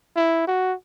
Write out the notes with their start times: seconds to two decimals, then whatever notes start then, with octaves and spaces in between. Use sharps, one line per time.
0.16 E4
0.47 F#4